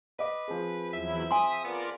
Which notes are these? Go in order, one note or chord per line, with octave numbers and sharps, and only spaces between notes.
B4 D#5 D6
F3 C4 G#4
E2 F#3 E4 E5
G#5 C6 D#6
B3 F4 A#4 D5